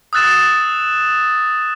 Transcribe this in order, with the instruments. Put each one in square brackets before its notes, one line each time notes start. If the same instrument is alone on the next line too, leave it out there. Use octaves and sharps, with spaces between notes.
[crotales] D#6 E6 F#6 A6 E7